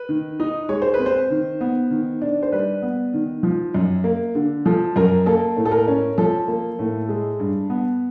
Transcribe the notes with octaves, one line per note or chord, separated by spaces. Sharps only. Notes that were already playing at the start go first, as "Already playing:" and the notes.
Already playing: B4
D#3
D#4
G#3 C#5
C5
B4
C4
C5
D#3
B3
D#3
D4
C5
G3 B4
B3
D#3
F3
F#2
A#3
D3
F3 A4
F#2 A#4
A#3 A4
A2
A4
A#4
C#4
F3 A4
A#3
A2
G#3
G2
B3